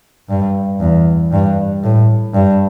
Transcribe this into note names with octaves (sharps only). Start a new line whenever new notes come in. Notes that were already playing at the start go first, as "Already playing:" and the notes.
G2
E2
G2
A2
G2